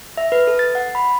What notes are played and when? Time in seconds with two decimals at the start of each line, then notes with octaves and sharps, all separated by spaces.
0.17 E5
0.32 B4
0.47 A4
0.59 A6
0.75 F#5
0.95 B5